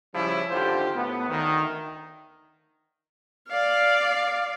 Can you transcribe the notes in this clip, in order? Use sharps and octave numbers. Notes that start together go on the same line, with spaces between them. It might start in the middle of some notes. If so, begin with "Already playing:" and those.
C#3 F3 G3 C#4 E4
G#1 D3 F4 G4 C5
A2 A3 B3
D2 D#3
D5 F5